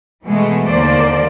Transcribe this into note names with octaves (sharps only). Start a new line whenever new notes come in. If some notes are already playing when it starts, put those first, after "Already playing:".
B2 E3 G#3 A3
D#2 D3 A#3 C5 D5